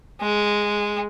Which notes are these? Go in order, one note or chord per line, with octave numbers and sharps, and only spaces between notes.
G#3